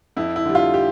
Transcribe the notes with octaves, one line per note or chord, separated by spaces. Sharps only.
F2 E4
E4
D3 G3
F4
G4